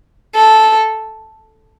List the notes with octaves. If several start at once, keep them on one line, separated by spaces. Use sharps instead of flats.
A4